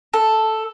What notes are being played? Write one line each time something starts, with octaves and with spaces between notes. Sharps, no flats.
A4